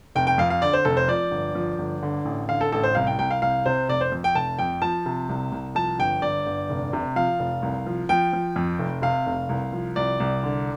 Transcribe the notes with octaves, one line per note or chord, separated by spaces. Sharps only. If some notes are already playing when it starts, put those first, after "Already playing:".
F1 G5
G5
F2 F5
F5
D3 D5
C5
F1 A4
C5
F3 D5
G1
F3
G1
D3
A1
D3 F5
A4
A1 A4
C5
C2 F5
G5
C2 G5
F5
C2 F5
C3 C5
F1 D5
C5
F2
G5
F1 A5
F2 G5
F3 A5
C3
C2
C2
F3 A5
G1 G5
G1 D5
G1
F1
C3
F3 F5
F1
C2
F3
F3 G5
F3
F2
F1
C3 F5
F1
C2
F3
C2 D5
C2
D3